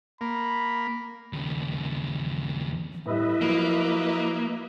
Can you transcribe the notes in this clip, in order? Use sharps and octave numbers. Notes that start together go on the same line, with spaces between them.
A#3 B5
D#2 C#3
A2 G3 E4 B4 D#5 E5
F3 F#3 A#3